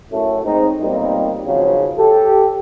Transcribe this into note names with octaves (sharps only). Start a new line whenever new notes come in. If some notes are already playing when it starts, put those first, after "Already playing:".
F#2 A2 A3
G#2 C4 D#4
B1 A#2 G3 A#3 C4 D#4
G#1 C#3 F3 F#3
G4 A4